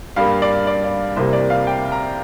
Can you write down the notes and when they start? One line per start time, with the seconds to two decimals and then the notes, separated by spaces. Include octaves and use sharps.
0.16 G2 G3 A#3 F5
0.42 D5
0.67 D5
0.84 D5
1.16 C2 C3 G3 A#3 C5
1.33 D5
1.50 F5
1.67 G5
1.92 A#5